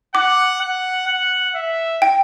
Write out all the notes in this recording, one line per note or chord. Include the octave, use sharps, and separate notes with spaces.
F#5 D6
F#5
F#5
E5
G5